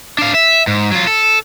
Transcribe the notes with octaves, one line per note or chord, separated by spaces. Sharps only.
D4 F5
E5
G#2
F#3 F4
A4